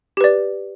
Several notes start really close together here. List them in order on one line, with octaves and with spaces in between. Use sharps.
G4 B4 D5